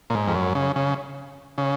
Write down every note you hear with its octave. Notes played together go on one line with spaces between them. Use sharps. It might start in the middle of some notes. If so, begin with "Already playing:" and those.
A#2
G#2
F2
F#2
C#3
C#3
C#3